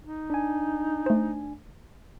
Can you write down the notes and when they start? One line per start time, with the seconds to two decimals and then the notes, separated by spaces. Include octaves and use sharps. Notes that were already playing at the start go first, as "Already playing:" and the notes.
0.03 D#4
0.30 D4 G#5
1.06 A3 C5